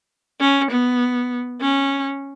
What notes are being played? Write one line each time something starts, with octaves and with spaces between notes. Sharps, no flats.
C#4
B3
C#4